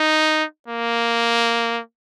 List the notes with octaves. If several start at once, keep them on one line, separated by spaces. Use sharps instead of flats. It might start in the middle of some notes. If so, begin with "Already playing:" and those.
Already playing: D#4
A#3